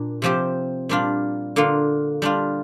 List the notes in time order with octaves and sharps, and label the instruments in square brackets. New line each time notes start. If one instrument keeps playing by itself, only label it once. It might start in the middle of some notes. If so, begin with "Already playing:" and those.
Already playing: [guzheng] A#2 D4
C3 F3 C4 G4
A#2 G3 D4 F4
D3 A#3 F4
G3 D4 F4